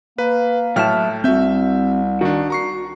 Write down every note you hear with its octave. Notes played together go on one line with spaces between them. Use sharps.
A#3 B4
A2 F#3 E5 G5 A5 F6
C2 C4 F#4 E5 G6
D#3 D4 F#4
A#5 C#6 C7